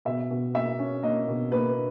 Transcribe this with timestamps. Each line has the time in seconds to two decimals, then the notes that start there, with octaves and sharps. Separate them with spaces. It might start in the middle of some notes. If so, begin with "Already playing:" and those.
0.05 B2 E5
0.30 B2
0.54 A#3 E5
0.79 C#4
1.03 A#3 D#5
1.28 B2
1.52 A#3 B4